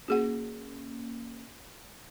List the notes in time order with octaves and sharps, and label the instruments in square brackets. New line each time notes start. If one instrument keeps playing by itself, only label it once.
[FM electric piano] A#3 C#4 [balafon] F#4 G#4 F#5